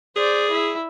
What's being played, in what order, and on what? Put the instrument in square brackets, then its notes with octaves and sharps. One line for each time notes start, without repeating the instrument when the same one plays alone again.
[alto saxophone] G#4 [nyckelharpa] C5 D5
[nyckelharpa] E4 E5